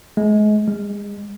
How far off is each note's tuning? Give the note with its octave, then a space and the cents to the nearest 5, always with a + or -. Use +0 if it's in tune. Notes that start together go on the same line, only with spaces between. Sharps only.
G#3 +30
G#3 -30